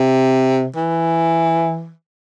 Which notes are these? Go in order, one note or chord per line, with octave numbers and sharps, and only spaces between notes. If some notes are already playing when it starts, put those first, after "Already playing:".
Already playing: C3
E3